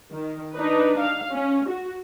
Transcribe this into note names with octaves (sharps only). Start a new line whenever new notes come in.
D#3
D4 D#4 B4
F5
C#4
F#4